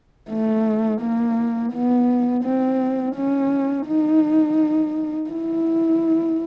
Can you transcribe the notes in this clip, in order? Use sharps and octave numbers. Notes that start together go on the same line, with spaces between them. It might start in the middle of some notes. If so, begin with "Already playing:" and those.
A3
A#3
B3
C4
C#4
D#4
E4